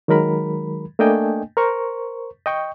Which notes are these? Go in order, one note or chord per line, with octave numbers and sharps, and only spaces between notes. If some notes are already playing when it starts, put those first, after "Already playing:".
D#3 F#3 G#3 A#4 B5
A3 A#3 D4 D#5 G5 G#5
A#4 C5 C#6
D#5 G5 C#6